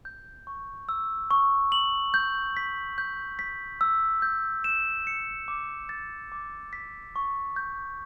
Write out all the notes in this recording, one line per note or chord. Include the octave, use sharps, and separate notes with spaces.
G6
C#6
E6
C#6
F#7
G6
B6
G6
B6
E6
G6
E7
C#7
D6
A6
D6
B6
C#6
G6